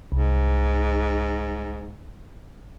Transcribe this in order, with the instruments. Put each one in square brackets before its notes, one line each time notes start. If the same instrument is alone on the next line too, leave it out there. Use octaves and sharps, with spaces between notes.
[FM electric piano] C2 [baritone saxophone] G#2